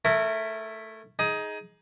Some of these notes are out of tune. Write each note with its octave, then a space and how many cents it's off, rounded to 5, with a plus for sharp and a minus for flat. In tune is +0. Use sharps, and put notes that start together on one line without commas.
A3 +0 E4 +0 A#4 -25
D#4 +15 G#4 +15